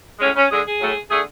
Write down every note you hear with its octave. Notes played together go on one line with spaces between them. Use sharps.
A2 G#3 C#4
C#4
D3 G#3 G#4
G#4
A2 F#3 A3
D3 A3 G#4